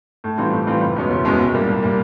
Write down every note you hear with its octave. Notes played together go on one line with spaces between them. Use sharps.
A2
E3 G3 C4 F4
A2
E3 G3 C4 F4
F#1
E2 B2 G#3 C#4
F#1
E2 B2 G#3 C#4
C2
A#2 G3 A#3
C2
A#2 G3 A#3